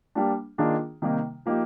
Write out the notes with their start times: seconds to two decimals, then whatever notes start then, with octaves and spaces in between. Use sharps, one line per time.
0.15 G3 A#3 D4
0.58 D#3 A#3 D4 F4 G#4
1.02 C3 D#3 G3 A#3 D#4
1.46 F3 A#3 D#4 G4